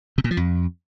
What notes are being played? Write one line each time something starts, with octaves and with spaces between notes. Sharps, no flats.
C3
A#2
F3
F2